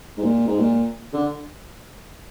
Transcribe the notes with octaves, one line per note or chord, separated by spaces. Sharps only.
G#2
A#2
G#2
A#2
D3